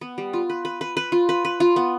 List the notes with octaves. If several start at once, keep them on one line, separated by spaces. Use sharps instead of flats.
B3
G3
F4
B4
B4
B4
B4
F4
B4
B4
F4
B3